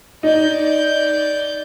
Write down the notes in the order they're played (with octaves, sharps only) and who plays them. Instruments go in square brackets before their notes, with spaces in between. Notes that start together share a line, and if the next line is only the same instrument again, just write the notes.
[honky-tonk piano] D#4 [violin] D5 G6